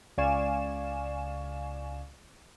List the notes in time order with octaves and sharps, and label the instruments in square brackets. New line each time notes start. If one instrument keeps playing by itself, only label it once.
[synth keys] C#2 D5 F5 G#5 C#6 E7